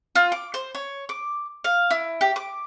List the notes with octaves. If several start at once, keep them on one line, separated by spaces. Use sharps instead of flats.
F4
D6
C5
C#5
D6
F5
E4
G4
D6